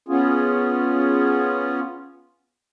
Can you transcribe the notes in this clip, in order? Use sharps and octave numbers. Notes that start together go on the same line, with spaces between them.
B3 C#4 F4 G#4